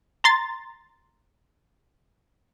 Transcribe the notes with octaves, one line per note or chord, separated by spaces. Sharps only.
A#5 C6 A6